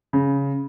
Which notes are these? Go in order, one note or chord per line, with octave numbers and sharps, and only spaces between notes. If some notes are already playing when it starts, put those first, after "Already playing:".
C#3